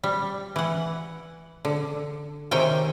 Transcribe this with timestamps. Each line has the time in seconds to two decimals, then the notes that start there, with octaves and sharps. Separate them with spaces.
0.04 G3
0.56 E3 F#5
1.65 D3
2.51 C3 D#3 C#5 G5 G#5